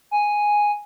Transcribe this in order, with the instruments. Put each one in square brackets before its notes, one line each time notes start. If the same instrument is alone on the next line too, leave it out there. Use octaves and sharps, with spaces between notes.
[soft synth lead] G#5